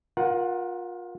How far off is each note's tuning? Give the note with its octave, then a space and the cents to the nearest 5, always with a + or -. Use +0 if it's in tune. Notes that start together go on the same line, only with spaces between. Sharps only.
F4 +30 A#4 +25 F#5 +0